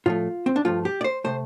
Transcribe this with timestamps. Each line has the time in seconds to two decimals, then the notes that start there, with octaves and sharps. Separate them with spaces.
0.06 A2 F3 A3 F4
0.46 C4
0.56 D4
0.65 G2 F3 A3 F4
0.85 G4
1.01 D5
1.04 C5
1.24 C3 A3 C5